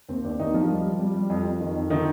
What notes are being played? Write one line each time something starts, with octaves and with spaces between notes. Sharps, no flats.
D#2 C4
D#2 D4
D#2 D#3 D#4
D#3 F3 F4
G3
G3
G3
G3
F2
F2
D#3
F2
D3 D#3 D#4